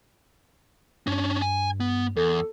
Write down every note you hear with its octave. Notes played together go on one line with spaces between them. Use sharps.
G2 C#4 D4
G#5
B3
E2 A4